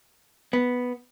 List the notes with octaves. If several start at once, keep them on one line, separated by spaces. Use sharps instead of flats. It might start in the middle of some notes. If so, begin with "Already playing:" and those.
B3